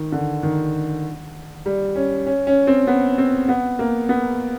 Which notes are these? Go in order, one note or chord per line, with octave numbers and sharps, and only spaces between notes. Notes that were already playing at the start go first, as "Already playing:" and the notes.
Already playing: D#3
D3
D#3
G3
C#4
C#4
C#4
C4
B3
C4
B3
A#3
B3